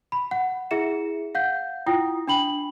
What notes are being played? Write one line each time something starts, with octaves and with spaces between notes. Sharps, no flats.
B5
F#5
E4 G#4 E5 C#7 E7
F5 F#5 G6
E4 F4 G5 D#6
D4 G5 B5 F#7